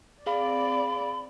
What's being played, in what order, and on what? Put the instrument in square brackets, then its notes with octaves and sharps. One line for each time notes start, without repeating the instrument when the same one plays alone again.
[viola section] C4 D5 [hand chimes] G#4 F5 [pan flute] B5